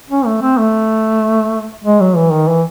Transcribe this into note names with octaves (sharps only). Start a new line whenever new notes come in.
C#4
A3
C4
A3
G#3
F#3
E3
D#3
E3